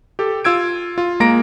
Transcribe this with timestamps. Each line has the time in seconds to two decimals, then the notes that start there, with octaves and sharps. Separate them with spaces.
0.19 G4 A4
0.44 F4 E6 G#6 D7
0.98 F4
1.20 G#3 A#3 A#5 A#6 D7